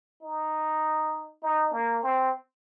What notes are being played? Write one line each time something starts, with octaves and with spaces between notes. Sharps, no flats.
D#4
D#4
A#3
C4